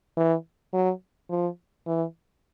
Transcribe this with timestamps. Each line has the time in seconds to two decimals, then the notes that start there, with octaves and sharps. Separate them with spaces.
0.17 E3
0.74 F#3
1.30 F3
1.87 E3